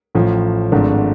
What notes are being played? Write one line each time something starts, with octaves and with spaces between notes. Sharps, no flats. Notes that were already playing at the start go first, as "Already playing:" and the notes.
A1 A2 F3
G#1 G#2 F3 A3 D4